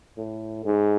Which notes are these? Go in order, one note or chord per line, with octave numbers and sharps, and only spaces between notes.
A2
G#2